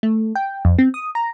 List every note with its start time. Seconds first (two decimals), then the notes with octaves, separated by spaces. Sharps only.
0.03 A3
0.35 G5
0.65 F2
0.79 C4
0.94 D#6
1.15 A#5